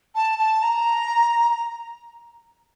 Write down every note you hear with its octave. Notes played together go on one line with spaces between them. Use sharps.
A5
A5
A#5